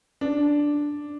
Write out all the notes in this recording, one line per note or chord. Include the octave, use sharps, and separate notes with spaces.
D4